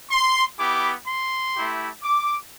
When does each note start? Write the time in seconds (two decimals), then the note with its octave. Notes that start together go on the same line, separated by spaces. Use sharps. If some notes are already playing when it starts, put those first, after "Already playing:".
0.11 C6
0.59 B3 E4 G4 D6
1.07 C6
1.55 A3 E4 G4
2.03 D6